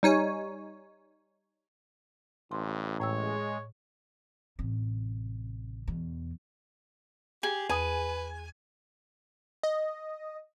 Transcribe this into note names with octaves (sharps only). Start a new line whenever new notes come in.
G3 D#4 C#5 G#5
A1 G2 C6
A2 G#3 C#5 G5 E6
A1 C3
E2 B2
G4 G#4
E2 B4 G#5 D#6
D#5